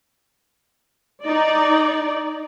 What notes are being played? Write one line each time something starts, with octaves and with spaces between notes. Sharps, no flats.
D#4 D5